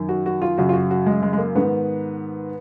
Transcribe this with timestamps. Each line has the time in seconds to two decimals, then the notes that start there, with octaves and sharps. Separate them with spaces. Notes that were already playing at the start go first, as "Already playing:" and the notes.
Already playing: F#2 D#3
0.09 F#4
0.26 F#4
0.42 F4
0.58 F#2 C#3 F#4
0.69 F4
0.73 F#4
0.91 F#4
1.06 G#3
1.23 G#3
1.33 G#3
1.38 A#3
1.55 G#2 D#3 B3